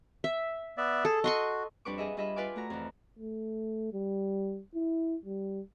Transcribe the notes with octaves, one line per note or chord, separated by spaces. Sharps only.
E5
B3 D5 E5
G#4 A4 A5
F#4 D#5 C6 C#6
F2 G3 D4 B4 C#6 D6
F4 G#4 D#5 E5
G3 D4 F4 D#5 E5 B5
F4 B4 D5 F5 G#5 D6
A3 F#4 A#5
F2 E3
A3
G3
E4
G3